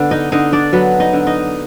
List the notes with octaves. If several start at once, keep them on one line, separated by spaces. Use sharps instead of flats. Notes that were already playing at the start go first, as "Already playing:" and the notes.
Already playing: D3 B3 B4
D#4 D#5
D3 D#4 D#5
D4 D5
F#3 B3 B4
D#4 D#5
D3
D#4 D#5